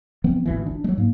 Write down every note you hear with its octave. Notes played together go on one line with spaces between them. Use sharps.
E3 F3 B3 C4
G#1 D2 E3
D4
F#3 G#3
G#2 A#3